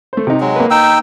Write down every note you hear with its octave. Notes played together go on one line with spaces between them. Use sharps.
A3 C5
C3 D#4
F#3 G#3
A#3 B4
D#4 G5 E6